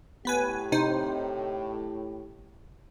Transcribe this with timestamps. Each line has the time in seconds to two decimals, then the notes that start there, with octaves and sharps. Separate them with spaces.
0.25 A2 B3 G4 B4 G#5
0.72 C3 D#4 C5